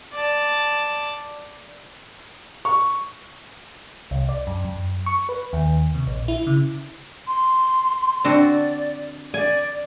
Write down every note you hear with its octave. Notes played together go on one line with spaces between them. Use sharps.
D5 A5
C#6
C2
D5
F#2
F#2
C#6
B4
D#2
C3
A#1
E4
C#3
C6
D3 C4 F#4 D5
D5 G#5